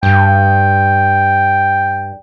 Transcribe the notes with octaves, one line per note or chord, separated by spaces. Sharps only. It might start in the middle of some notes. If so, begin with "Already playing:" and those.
G2 G5